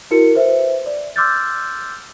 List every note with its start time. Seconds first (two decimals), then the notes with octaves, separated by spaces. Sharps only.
0.11 E4 F#4 A#4 C#7
0.35 B4 C5 E5
0.86 D5
1.16 C6 D6 E6 F6 G6 A6